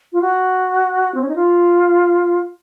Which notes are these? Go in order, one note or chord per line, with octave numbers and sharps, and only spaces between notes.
F4
F#4
C4
C#4
D#4
F4